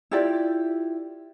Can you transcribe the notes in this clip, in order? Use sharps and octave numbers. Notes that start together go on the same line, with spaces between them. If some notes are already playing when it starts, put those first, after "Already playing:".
E4 F4 G4 D5